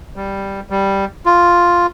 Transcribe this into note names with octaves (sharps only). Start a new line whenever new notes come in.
G3
G3
F4